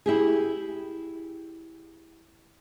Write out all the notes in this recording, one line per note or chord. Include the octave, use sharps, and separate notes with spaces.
E4 G4 G#4